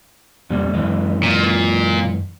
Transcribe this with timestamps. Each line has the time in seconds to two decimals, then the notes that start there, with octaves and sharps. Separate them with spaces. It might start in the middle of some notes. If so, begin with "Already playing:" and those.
0.50 F2 A#2 G3
0.74 F#2 E3 G#3
1.23 A#2